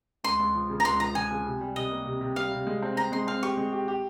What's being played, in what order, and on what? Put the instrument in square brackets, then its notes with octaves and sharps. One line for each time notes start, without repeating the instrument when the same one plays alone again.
[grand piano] C#2 [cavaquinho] C6
[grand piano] C#2
F3
C#3
[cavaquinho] A#5
[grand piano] C#2 [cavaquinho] C6
[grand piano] F3 [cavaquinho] A#5
[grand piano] F3 [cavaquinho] G#5
[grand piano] C#3
C3
G3
[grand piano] C3 [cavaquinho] D#5
[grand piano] A#3
C3
C3
[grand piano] G3 [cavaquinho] F5
[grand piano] C3
G#3
C4
[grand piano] C4 [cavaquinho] A#5
[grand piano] G#3 [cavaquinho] C6
[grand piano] C4 [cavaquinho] F5
[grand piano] G4 [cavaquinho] C#6
[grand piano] G#3
G4
G4